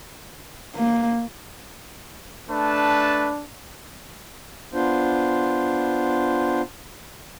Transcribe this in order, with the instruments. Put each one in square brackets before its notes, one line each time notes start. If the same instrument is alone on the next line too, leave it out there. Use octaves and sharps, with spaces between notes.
[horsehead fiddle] A#3
[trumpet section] A3 B4 A5 [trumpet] D4
[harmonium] B3 D4 F4 C5